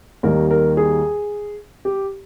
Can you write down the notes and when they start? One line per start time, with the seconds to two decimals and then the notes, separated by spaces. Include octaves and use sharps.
0.23 D#2 D#3 G3 A#4
0.51 A#4
0.77 G#4
1.85 G4